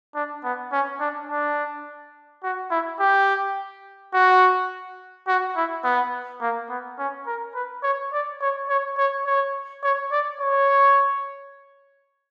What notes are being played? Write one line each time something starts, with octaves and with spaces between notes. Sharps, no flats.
D4
B3
C#4
D4
D4
F#4
E4
G4
F#4
F#4
E4
B3
A#3
B3
C#4
A#4
B4
C#5
D5
C#5
C#5
C#5
C#5
C#5
D5
C#5